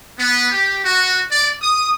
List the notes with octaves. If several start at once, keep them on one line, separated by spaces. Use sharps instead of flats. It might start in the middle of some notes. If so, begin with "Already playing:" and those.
B3
G4
F#4
D5
D#6